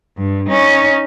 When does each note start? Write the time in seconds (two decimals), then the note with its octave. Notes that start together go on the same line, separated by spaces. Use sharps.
0.17 G2
0.48 C#4 D#4